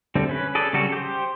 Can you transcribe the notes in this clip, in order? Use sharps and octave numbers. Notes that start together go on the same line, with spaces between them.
D3 G3 A3 C4
C#4 B4
G#4 A4 D5
C#3 F#3 G3 F#4 A4
G4 C5